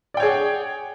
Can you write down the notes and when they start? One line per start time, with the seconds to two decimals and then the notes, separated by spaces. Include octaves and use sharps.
0.14 D5
0.17 G5
0.20 C#5
0.23 G#4
0.25 F#5